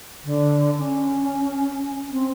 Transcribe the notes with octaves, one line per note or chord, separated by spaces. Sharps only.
D3
C#4
C4